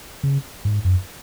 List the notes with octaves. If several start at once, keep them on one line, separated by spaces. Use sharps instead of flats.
C#3
G#2
F#2